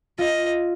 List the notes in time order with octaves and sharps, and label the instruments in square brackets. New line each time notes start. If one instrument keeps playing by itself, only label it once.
[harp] F4 [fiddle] D#5